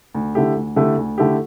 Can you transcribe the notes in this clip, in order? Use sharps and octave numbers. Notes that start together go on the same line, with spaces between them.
D2
D3 A3 E4 G4
D2
D3 A3 E4 G4
D2
D3 A3 E4 G4